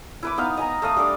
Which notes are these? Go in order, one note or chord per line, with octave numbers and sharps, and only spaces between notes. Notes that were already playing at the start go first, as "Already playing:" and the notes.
E4 B4 D6
B3 D#4 E5 F5
D#5 G#5 A#5
A3 F5 D#6
G3 D4 A4 D6